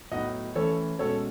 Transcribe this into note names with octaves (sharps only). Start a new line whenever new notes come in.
A2 F#3 B3 D#4 D#5 F#5
E3 A3 C#4 A4 C#5
B2 G#3 C#4 A4 C#5